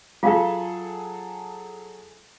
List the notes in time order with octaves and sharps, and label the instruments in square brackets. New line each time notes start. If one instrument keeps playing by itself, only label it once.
[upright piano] F#3 G#4 A4 [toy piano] F4 F5